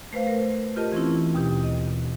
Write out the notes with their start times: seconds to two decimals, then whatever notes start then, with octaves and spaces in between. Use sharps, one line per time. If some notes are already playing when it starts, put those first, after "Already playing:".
0.13 A3 B4 C5 F5
0.27 A#4
0.76 F4 G4 A#4 D#5 A5
0.92 E3 C4 C#4 E4
1.34 D#2 B2 G4
1.64 D#5